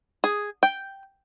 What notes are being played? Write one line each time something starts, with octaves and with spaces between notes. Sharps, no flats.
G#4
G5